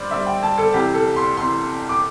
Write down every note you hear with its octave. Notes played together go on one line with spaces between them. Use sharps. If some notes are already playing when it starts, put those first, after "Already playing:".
Already playing: G2 G3 C5 D5
G2 G3 E5
G5
A5
A4
C2 C3 E3 G4
A4
C6
C2 C3 E3 C6
D6